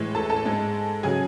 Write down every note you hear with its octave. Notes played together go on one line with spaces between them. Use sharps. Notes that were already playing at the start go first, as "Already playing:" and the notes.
Already playing: A2 E3 G#3
A4 A5
A4 A5
G#2 G#3
C#3 F#3 G#4 G#5